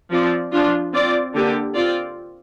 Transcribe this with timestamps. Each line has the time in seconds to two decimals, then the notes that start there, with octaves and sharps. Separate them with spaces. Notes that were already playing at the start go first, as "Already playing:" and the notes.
0.11 F3 C4 F4 D5
0.52 F3 D4 F4
0.93 C4 F4 D5
1.34 D3 A#3 G4
1.76 C4 F4 D5